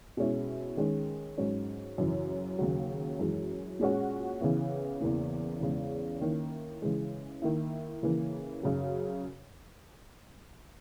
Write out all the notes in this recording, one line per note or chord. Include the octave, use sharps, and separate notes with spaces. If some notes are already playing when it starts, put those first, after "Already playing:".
B2 G#3 C#4 E4
D#3 G#3 C#4
G#2 F#3 C#4
F#2 C#3 E3
D#2 C#3 F#3
F#2 E3 G#3
A#2 G#3 C#4 F#4
C#3 E3 B3 E4
E2 C#3 E3 A#3
E2 C#3 G#3
D#3 A#3 C#4 E4
C#3 E3 G#3
D#3 A#3 E4
C#3 E3 A#3
F#2 C#3 F#3